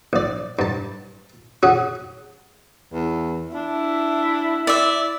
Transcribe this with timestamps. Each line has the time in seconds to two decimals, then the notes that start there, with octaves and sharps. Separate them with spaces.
0.13 A#1 D5
0.59 G2 A5
1.63 C#4 F#4 G#4
2.93 E2
3.55 D4 E4
4.67 D5 E5